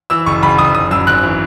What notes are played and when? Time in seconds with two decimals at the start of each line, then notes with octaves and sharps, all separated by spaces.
0.10 E3 E6
0.26 F#1 C#6
0.42 F#1 B5
0.58 F#1 D#6
0.74 F#1 D#6
0.91 F#2 E6
1.07 G#1 F#6
1.23 E3